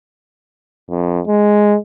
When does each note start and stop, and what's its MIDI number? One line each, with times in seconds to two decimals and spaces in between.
0.90 1.20 41
1.27 1.77 56